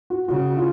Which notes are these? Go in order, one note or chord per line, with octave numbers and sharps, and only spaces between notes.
F#4
C#3 F#4
F4